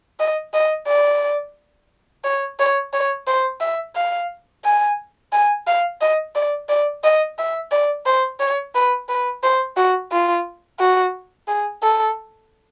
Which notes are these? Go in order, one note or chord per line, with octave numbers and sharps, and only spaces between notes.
D#5
D#5
D5
C#5
C#5
C#5
C5
E5
F5
G#5
G#5
F5
D#5
D5
D5
D#5
E5
D5
C5
C#5
B4
B4
C5
F#4
F4
F#4
G#4
A4